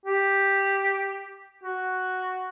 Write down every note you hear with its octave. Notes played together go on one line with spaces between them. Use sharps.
G4
F#4